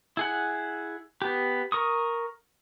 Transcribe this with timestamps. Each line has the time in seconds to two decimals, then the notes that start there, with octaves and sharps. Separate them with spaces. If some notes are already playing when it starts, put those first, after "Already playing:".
0.17 E4 G#4 F#5
1.22 B3 G4
1.72 A#4 C#6 D#6